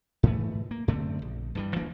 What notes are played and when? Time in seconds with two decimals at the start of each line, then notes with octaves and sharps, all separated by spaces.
0.23 G#2 E3 A3
0.71 A#3
0.88 F#2 D3 A3 C4
1.22 A#1
1.55 G2 E3 G3
1.76 D1 E3 A#3 D4